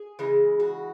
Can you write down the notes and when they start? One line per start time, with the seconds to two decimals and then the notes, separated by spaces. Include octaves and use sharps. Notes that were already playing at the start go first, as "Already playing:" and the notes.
Already playing: G#4
0.19 C#3 E3 G#3
0.60 F#4